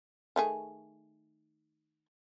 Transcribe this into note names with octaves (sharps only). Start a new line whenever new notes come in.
D#3 A3 G#4